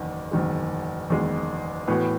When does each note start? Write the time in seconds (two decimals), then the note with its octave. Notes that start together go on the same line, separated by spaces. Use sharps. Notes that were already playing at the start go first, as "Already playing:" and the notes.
Already playing: F#1 E2 D#3
0.31 F#1 E2 D#3 G#3
1.10 F#1 E2 D#3 G#3
1.87 A2 E3 B3 F#4